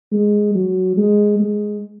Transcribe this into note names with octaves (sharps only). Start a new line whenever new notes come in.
G#3
F#3
G#3
G#3